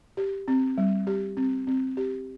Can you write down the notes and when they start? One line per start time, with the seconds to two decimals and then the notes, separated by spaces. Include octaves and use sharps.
0.17 G4
0.48 C4
0.78 G3
1.07 G4
1.37 C4
1.67 C4
1.97 G4